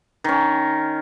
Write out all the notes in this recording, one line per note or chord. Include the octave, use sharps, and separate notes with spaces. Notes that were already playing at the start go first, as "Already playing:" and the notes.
D#3 C#4